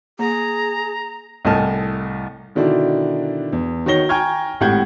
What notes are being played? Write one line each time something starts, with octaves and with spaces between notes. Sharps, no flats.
A#3 G#4 A#5
C2 A2 D#5 G#5 A5 F6
B2 D3 D#3 D4 E4 F#4
E2
D#3 F#4 C#5 A#6 G7
G5 G#5 A#5 C#6 F6 G#6
G#1 A2 G4 F#5 G6 G#6